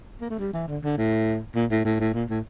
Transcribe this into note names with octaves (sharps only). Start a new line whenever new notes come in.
A#3
A3
G3
E3
D3
D3
A2
A#2
A2
A2
A2
A#2
A2